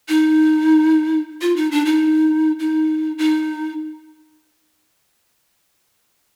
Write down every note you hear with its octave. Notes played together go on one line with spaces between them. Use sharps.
D#4
F4
D#4
D4
D#4
D#4
D#4